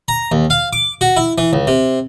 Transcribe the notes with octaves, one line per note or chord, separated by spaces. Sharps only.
A#5
D#2
F5
D6
F#4
E4
E3
C#2
C3